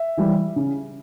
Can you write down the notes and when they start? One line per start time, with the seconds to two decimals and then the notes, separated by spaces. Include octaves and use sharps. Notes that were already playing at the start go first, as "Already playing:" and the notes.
Already playing: E5
0.17 E3 G3
0.56 C#3